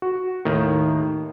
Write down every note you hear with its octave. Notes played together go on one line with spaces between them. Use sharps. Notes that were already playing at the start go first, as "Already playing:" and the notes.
F#4
D#2 A2 D#3